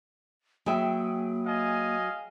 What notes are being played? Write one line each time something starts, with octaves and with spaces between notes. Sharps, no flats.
F#3 A#3 G#4 E5 G5 B5
D#5 F5 G#5